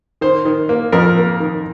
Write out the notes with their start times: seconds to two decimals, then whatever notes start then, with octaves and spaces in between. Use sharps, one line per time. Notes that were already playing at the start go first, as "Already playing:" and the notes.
0.21 D#3 C5
0.45 D#3
0.69 A#3
0.92 F2 A#4
1.16 A#3
1.40 D#3